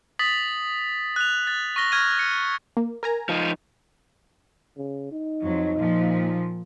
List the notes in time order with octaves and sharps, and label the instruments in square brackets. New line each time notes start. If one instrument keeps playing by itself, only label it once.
[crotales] D#6 A6 B6 F#7
F#6 F7
A6
C#6 F6 A#6 G7
C#6 F6 G#6 A#6 D#7
C#7
[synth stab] A#3
A#4 G#5 A#5
[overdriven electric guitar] F3 D#4
[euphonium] C#3
D#4
[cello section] F2 F#3
A#2 F3